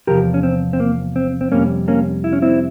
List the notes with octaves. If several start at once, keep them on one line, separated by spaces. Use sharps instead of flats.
E2 C3 F3 G4 A#4
C#4
C4
C4
A#3
C4
C4
F2 C3 G3 A#3 C#4
A#3 C#4
E4
C#4
C4 E4